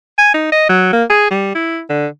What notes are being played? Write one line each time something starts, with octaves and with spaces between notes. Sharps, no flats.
G#5
D#4
D#5
F#3
A#3
G#4
G3
E4
D3